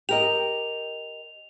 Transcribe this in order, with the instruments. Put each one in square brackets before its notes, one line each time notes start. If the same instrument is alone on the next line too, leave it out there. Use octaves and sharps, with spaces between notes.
[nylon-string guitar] G4 A#4 D#5 [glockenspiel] F7